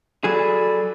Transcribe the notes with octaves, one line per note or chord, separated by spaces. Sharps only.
F#3 G#4 A4 D5 B5